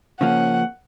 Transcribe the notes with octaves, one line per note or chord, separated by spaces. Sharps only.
C#3 F3 A#3 C#4 F#5